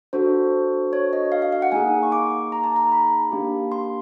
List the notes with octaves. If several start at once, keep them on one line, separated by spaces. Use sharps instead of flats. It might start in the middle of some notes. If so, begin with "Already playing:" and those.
D4 F#4 A4 C5
C#5
D#5
F5
F5
F5
F#5
A#3 D#4 G#4 G#5
C#6
D6
A#5
A5
A#5
B5
A#3 D4 G4
C6